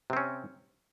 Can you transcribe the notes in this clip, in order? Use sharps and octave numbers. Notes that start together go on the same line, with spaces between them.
C3 C4 C#4